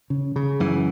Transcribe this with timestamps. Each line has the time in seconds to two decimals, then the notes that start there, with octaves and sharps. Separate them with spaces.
0.10 C#3
0.36 C#3
0.60 F#2 E3